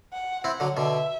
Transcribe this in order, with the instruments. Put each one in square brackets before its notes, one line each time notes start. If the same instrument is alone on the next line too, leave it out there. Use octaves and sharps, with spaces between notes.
[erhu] F#5
[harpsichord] C4 E4 [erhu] F#5
[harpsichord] D3 F#3
[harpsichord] B2 D3 [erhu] E5